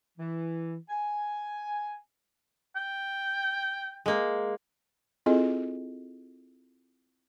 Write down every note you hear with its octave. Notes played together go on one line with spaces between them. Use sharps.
E3
G#5
G5
G#3 A#3
C4 E4 F4 G#4 A4 D#5